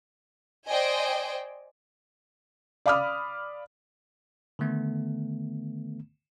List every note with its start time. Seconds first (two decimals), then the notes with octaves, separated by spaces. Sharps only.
0.69 C5 D5 D#5 G5 G#5
2.86 D5 F5 B5 D6 D#6 F6
4.59 D3 D#3 A3 B3